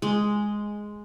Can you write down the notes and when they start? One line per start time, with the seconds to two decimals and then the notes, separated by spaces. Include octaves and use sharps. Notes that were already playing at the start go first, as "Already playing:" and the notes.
0.02 G#3